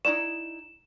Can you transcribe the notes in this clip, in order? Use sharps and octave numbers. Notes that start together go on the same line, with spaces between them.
D#4 E4 D5 E7